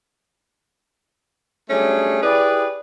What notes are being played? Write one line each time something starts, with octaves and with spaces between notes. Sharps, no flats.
F#3 G3 A3 C#4 D4 G#4
E4 G4 G#4 B4 D5